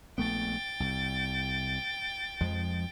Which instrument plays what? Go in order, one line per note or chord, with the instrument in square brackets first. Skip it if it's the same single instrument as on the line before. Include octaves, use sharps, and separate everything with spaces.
[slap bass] A#1 A3 B3 [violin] G5 A6
[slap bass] C2
F2 F3 G#3